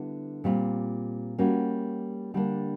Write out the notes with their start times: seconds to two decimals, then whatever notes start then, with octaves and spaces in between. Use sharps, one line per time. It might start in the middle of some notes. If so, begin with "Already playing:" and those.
Already playing: D3 G3 B3 E4
0.44 A#2 G3 C4 F4
1.38 G3 A#3 C#4 F#4
2.34 D3 G3 A#3 D4